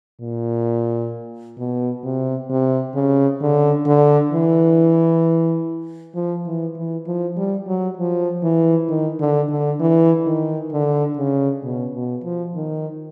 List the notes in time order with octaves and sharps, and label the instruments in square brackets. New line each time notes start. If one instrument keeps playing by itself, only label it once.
[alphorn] A#2
B2
C3
C3
C#3
D3
D3
E3
F3
E3
E3
F3
G3
F#3
F3
E3
D#3
D3
D3
E3
D#3
D3
C#3
B2
B2
F3
D#3